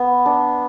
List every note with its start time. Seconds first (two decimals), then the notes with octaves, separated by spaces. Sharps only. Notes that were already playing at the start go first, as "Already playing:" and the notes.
Already playing: B3
0.26 D4